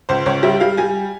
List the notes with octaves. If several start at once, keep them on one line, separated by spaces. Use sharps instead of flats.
C#2 C5
C#2 C#5
G3 E5
G3 F5
G3 G#5